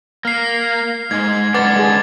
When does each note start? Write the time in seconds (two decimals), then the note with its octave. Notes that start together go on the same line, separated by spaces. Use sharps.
0.25 A#3 F6 C7
1.11 G#2 G#3 G#6
1.54 C#3 G#3 D4 B4 F#5 D6 G#6 A6
1.76 G#3 G#4